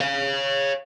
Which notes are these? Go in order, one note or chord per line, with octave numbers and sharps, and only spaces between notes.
C#5 F5